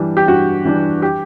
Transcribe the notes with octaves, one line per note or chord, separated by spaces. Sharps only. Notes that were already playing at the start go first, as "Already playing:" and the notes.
Already playing: G2 E3 G3 D4
G4
G2 F#4
E3 G3 D4
G4